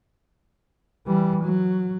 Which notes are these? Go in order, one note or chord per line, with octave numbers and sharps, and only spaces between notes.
E3 G3
F#3